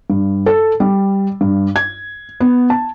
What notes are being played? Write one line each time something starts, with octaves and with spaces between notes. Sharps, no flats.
G2
A4
G3
G2
G#6
B3
A5